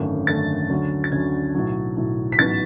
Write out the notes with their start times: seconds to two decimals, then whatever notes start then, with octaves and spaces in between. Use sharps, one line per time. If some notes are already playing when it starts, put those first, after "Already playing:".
Already playing: G#1 F#2 D3 A3 C#4
0.27 G#1 F#2 D3 A3 C#4 A6
0.70 D2 D3 F#3 C#4
1.04 A6
1.12 D2 D3 F#3 C#4 G#6
1.55 B1 A2 F#3
1.96 B1 A2 F#3
2.32 B6
2.39 A1 G#2 F#3 B3 A6